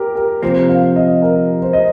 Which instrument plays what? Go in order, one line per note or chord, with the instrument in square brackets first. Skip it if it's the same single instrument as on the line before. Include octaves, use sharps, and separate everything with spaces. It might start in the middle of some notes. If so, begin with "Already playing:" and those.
Already playing: [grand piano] G4 A#4
A#4
[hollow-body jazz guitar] C3 F3 A#3 [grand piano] C5
[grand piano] F5
D#5
A#4
C5
D#5